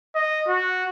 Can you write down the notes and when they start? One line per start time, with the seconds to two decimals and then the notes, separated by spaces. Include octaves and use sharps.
0.15 D#5
0.48 F#4